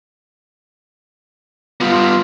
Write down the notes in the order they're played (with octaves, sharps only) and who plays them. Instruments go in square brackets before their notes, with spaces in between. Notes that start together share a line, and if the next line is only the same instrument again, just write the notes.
[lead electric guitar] G3 B3 [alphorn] F4